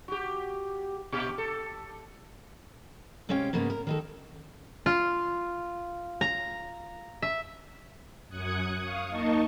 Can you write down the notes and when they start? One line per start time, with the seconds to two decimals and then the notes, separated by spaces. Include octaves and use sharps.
0.08 F#4 G4
1.12 A#2 G4
1.38 A4
3.29 C3 G#3 C#4 C#5 F5 G5
3.53 G#2 C#3 G#3 A#3 B3
3.70 A#4
3.87 D#3 D#4 A4
4.86 F4
6.21 A#5
7.22 E5
8.29 F#2 D#6 F#6 G#6 C#7
8.79 F5 C#6 D#6
9.09 A#3 D#4 D#5 A5 C#6